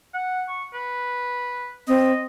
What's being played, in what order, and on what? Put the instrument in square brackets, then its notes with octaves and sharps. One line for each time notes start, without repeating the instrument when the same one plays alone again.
[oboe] F#5
C#6
B4
[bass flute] C4 [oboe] D#5